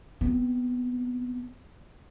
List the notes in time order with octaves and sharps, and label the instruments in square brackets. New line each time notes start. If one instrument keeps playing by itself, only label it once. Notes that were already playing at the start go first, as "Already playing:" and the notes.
[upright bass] B3 C4